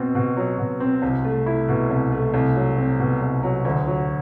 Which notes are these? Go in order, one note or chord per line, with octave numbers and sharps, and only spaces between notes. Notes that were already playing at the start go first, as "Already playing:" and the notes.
Already playing: B2 C4
B2
F#3
B2
C4
C2
A3
E4
B2
C2
A3
C2
F#3
C4
B2
C2
F#3
D2
F#3